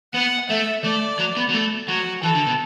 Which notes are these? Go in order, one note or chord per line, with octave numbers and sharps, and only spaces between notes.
B3 F#5
A3 E5
A3 D5
F#3
B3
F#3
A3
F#3 F#4
E3 A4
D3
B2